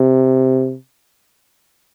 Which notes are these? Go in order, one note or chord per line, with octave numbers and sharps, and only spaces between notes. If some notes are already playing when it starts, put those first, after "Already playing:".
Already playing: C3